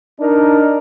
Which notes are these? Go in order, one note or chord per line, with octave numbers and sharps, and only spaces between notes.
D4 D#4 A#4